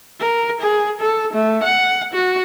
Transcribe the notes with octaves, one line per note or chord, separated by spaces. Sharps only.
A#4
G#4
A4
A3
F#5
F#4